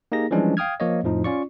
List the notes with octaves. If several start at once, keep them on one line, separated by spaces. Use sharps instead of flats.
A#3 D#4 G4 G#4 A#6
E3 F3 G3 G#3 C#4 D4
F5 G5 D#6 F6 G#6
F3 A#3 C#5 D#5
F2 A2 F3 D#4
C#4 F4 D5 C#6